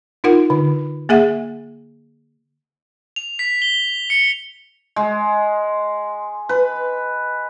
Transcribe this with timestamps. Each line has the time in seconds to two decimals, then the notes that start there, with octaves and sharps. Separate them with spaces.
0.24 D#4 F4 A#4 F#5
0.50 D3
1.09 A#3 G#4 E5 F#5
3.16 F7
3.39 B6
3.62 G7
4.10 C#7
4.96 G#3
6.49 B4